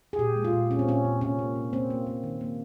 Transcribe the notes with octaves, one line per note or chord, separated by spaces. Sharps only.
G#4
A#2 G4
G#3
F4
A#2
A#2 C#4
C4
A#2 C#4
A#2
C3 C#4
A#3
C3
A#3 C4
A#3
A#3
D#3
A#3